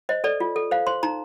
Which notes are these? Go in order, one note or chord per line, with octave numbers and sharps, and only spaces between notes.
C5 D#5
A4 D5
F4
A4
C5 F5
C5 C6
D#4 A#5